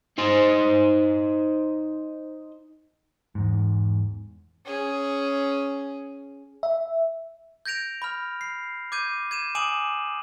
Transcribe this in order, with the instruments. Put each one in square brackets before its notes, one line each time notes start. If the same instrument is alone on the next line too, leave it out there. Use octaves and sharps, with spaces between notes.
[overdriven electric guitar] D#4 C5
[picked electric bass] E2 G#2
[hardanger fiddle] C#4 G#4
[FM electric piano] E5
[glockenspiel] G6 G#6 A#6 D7 F7
B5 F6
C7
D6 G6 G#6 D#7
G#6 D#7 E7
G#5 D6 D#6 D7 E7 F#7